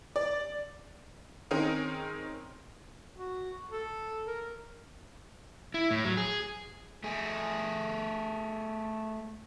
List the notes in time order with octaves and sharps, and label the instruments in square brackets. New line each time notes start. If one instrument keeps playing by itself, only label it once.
[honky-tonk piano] D5
D#3 C4 C#4 D#4 G#4 A#4
[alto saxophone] F#4
A4
A#4
[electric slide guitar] E4
A2
F#3
G#4
[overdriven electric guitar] A3 G#4